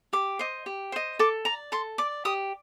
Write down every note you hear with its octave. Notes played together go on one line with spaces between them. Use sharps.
G4 D6
C5 D#5
G4
C5 D#5
A4 D6
D5 A#5
A4 C6
D5 D6
G4 D#6